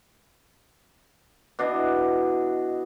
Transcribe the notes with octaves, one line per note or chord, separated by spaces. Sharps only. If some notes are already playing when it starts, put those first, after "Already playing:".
B2 D4 E4 D#5